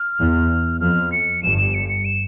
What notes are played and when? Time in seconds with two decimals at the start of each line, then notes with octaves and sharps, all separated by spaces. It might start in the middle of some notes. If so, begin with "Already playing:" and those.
Already playing: F6
0.19 E2
0.81 F2 F6
1.12 C#7
1.43 G1 G2 E7
1.58 E7
1.74 C#7
1.89 C#7
2.05 E7